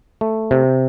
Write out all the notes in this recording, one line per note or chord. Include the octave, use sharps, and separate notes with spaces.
A3
C3